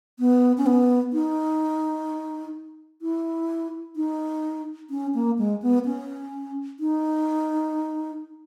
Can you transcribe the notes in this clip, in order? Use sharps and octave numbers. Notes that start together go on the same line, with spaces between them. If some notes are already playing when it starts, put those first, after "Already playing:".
B3
C#4
B3
D#4
E4
D#4
C#4
A#3
G#3
B3
C#4
D#4